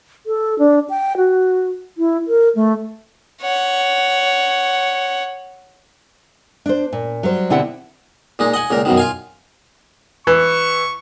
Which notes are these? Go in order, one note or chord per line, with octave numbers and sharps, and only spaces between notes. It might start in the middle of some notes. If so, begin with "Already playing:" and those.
A4
D4
G5
F#4
E4
A#4
A3
C#5 F#5
D4 C5
A#2
F#3 G3 C5
B2 D3 C4 E4 G4 F#5
A#2 G#3 D#4
D#5 F#5 G#5
C#2 A#2 A#4
F#2 B2 D#3
F4 F5 G#5
E3 C#6